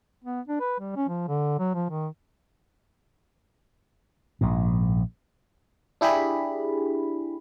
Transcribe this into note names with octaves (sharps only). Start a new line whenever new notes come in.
B3
D4
B4
G3
C#4
F3
D3
F#3
F3
D#3
A#1 G#2
D4 E4 G4 G#4 B5